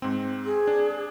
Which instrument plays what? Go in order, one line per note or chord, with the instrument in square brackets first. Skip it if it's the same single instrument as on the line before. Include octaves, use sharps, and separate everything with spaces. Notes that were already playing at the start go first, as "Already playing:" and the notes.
[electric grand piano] G#2 C4
[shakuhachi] G#4
[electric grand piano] D4